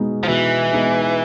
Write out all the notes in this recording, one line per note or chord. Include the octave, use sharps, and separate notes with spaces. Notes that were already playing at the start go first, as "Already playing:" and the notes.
Already playing: B2 G#3 B3 D#4
F3
B2 E3
G#3 B3 D#4